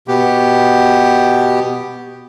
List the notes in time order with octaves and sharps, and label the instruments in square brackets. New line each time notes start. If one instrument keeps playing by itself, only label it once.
[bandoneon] B2 B3 G4